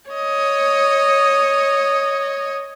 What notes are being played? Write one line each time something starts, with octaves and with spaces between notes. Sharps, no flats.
C#5 D#5